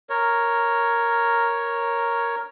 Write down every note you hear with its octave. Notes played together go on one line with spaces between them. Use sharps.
A#4 C#5